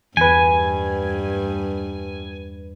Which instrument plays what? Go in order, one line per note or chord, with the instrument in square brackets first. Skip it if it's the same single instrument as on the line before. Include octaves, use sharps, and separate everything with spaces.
[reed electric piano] E2 B4 [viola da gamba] G2 [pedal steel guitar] G#5